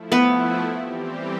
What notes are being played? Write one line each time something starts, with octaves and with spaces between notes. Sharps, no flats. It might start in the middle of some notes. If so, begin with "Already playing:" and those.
Already playing: F3 A3 E4
B3 B4
E3 G3 C4 G4